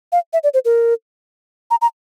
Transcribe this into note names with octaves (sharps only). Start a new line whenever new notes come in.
F5
E5
D5
C5
A#4
A#5
A#5